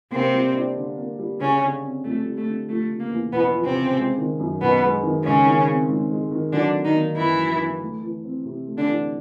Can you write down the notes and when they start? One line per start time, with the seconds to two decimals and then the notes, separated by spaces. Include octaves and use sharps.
0.12 C3 A#3 C4
0.34 G3
0.55 D4
0.76 D3
0.98 A#3
1.19 G3
1.40 C#3 G3 C#4
1.62 D3
1.83 C4
2.04 F2 A3
2.25 G3
2.37 A3
2.47 D3
2.69 F3 A3
2.89 C#3
3.00 A#3
3.11 E2
3.33 E2 B2 B3
3.54 F3
3.65 C3 C4
3.75 C#3
3.97 G#3
4.18 D#3
4.39 F#2
4.61 F#2 B2 B3
4.83 G#3
5.03 D#3
5.24 C#3 G#3 C#4
5.46 D#3
5.67 C4
5.89 G#2
6.10 G#3
6.31 D#3
6.52 D3 F#3 D4
6.74 D3
6.84 D#3 D#4
6.95 A#3
7.16 F#2 E3 E4
7.38 F#3
7.60 D3
7.81 A3
8.02 E3
8.24 C4
8.45 C3
8.66 A3
8.77 D3 D4
8.88 E3